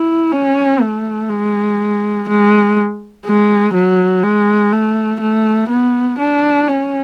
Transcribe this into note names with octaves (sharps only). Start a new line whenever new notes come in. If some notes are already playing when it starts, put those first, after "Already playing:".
Already playing: E4
C#4
A3
G#3
G#3
G#3
F#3
G#3
A3
A3
B3
D4
C#4